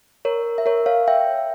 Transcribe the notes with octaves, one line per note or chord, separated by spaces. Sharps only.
A#4 C#5
E5
A#4 C#5
C#5 F5
E5 G5